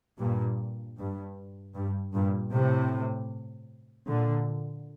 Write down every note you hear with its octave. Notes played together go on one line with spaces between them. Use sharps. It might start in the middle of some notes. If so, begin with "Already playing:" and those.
G2 A#2
G2
G2
G2 A#2
A2 C3
A#2 D3